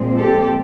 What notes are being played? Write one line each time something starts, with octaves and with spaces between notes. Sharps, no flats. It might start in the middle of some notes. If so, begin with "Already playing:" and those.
Already playing: A#2 F3 G#3 C4
G4 A4